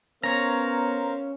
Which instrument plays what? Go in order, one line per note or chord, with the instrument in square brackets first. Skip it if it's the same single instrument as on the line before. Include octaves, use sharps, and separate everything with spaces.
[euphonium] B3 [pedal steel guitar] C#4 C#5 [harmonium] A#4 C5 F5 [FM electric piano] A#5